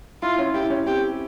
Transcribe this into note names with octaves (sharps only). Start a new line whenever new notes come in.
E4 F4
C#4
E4 G4
C#4
C4 G4